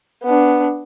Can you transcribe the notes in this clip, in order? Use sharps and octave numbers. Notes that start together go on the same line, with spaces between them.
B3 D4